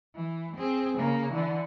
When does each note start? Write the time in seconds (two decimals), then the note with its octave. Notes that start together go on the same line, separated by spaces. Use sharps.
0.15 E3
0.56 C4 G#4
0.98 C#3 A#3
1.32 D3 E3